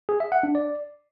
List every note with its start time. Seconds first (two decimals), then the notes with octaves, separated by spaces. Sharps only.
0.09 G#4
0.20 E5
0.32 F#5
0.43 D4
0.55 D5